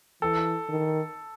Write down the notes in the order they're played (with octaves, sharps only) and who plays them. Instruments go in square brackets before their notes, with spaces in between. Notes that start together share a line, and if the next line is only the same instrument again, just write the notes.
[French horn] E3 [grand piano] A4
[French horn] D#3